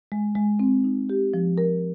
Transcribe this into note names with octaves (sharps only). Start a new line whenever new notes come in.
G#3
G#3
C4
D#4
G4
F3
A#4